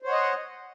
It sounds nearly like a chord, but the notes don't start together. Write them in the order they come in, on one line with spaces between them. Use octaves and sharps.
C5 C#5 F#5 D#5